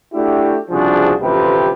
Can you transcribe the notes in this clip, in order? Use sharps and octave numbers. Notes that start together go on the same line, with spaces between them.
A3 D4 E4 F#4 G4
C2 C#3 F3 D4 F#4 G#4
A1 D2 C3 F3 G4 B4